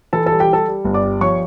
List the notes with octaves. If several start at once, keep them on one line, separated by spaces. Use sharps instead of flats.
E3 A4 A5
A4 A5
G3
G4 G5
G3 A4 A5
G3
G1
D5 D6
G3
F3 C#5 C#6